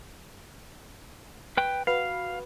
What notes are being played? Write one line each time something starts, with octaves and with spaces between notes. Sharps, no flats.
B4 G5
F#4 B4 F5